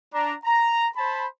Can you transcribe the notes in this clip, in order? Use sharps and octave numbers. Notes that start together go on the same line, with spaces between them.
D4 A#5
A#5
C5 A5 B5